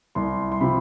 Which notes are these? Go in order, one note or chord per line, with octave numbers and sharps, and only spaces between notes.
C2 C6
C6
C3 F3 B5